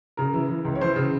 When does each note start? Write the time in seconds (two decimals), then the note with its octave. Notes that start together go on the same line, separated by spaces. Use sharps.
0.17 C#3 A#4
0.34 E3
0.49 E3
0.65 C#2
0.75 C#5
0.81 E3 C5
0.96 C#3